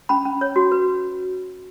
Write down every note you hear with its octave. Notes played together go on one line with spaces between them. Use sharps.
C#4 B5
C#4
C#5
F#4
B4